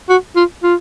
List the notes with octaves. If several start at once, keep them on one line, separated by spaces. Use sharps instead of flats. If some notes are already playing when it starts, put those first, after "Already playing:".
F#4
F4
F4